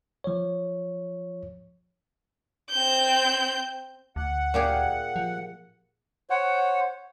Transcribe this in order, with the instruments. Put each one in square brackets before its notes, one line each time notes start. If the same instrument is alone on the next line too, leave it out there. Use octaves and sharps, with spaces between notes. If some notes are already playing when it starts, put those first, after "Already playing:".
[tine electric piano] F3 C#5
[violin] C4 G6
[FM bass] D2 [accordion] F#5
[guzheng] A#2 G4 G#4
[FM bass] F3
[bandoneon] C5 C#5 [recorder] F#5